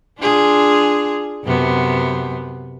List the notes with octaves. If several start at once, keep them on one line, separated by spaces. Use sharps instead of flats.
D4 F4 G#4
F#2 C3 B3